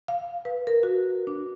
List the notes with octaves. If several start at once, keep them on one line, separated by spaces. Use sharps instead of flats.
F5
B4
A#4
F#4
D4